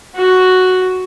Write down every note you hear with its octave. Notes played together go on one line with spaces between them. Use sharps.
F#4